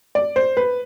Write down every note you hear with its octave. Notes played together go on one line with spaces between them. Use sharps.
D5
C5
B4